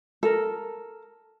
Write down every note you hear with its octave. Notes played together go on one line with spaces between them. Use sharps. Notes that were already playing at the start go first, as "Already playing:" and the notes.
A4 A#4